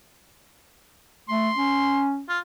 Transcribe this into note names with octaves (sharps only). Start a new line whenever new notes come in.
A3 C6
C#4
F4